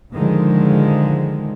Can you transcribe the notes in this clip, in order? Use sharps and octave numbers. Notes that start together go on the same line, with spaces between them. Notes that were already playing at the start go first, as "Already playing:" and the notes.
D3 D#3 F3 G#3